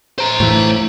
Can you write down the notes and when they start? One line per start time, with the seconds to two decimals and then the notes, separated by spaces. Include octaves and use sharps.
0.18 C5 A#5
0.40 A2 E3